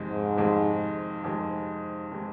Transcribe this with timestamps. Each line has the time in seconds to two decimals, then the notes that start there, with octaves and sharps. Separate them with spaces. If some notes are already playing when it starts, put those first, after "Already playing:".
Already playing: F2 C3 D#3 G#3
0.09 G#2
0.38 F2 C3 D#3 G#3
1.24 F2 C3 D#3 G#3
2.12 C3 D#3 G#3